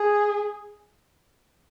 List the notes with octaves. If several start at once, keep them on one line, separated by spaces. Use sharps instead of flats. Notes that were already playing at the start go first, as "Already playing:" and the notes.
Already playing: G#4